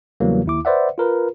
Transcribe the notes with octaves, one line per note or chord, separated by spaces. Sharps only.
E2 C#3 E3 F#3 G3 A#3
D#2 E4 D6
B4 C5 D5 E5 F#5
F4 A#4 B4